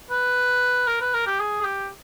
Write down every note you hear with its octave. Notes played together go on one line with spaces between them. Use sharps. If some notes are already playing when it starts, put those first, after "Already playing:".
B4
A#4
B4
A#4
G4
G#4
G#4
G4